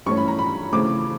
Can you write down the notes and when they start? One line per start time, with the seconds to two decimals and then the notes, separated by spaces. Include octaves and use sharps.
0.06 G2 E3 A3 C#4 C#6
0.17 B5
0.28 A#5
0.39 B5
0.73 C#3 E3 A3 C4 D6